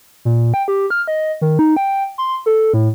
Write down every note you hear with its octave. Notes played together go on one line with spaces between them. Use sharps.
A#2
G5
G4
F6
D#5
D#3
D#4
G5
C6
A4
A2